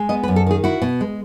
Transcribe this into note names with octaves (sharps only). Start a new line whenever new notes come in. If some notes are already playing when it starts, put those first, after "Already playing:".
Already playing: G#3
B3 D#5
B4
F#2
A4
D#3 G#4
E4 F#4
B2
G#3